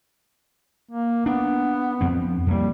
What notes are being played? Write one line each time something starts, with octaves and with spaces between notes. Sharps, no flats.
A#3
B3 D4
F2 C4
F2 G3 A#3